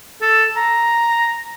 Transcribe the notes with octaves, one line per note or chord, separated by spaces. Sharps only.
A4
A#5